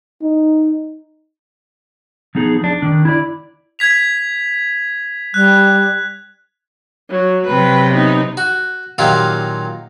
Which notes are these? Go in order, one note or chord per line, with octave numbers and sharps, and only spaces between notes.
D#4
F3 B3 D#4 G#4
D4
D#3 D4
E4 D5
G#6 B6 F7
G3 F#6
F#3
C3 F#3 B4 G5
B3 D#4
F#4
A#2 D#3 F#3 A#3 F4 G4